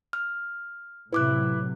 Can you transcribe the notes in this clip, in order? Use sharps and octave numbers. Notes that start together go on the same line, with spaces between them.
F6
A2 C3 F#3 E4 B4 D6 F#6